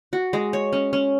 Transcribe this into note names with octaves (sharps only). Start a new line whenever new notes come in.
F#4
G#3
C#5
C#4
C#4